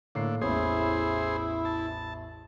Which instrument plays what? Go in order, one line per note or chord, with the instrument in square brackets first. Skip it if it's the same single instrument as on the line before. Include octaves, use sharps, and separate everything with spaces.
[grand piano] A2 A#3 C7 [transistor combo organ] D3
[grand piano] A1 E2 C#5 [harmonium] E4 [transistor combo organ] G#4 C5
[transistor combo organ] A5